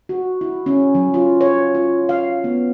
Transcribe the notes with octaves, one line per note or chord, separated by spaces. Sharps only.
F#4
E4
C#4
F#3
F4
C#5
F4
F5
B3